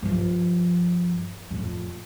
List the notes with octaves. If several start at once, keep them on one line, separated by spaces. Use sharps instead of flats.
G2 F3
F2 A2